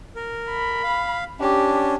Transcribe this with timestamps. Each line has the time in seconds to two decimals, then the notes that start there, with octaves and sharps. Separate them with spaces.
0.15 A#4
0.50 B5
0.84 F5
1.41 C#4 D4 G4